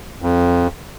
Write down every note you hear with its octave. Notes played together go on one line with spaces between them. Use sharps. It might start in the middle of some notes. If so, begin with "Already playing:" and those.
F2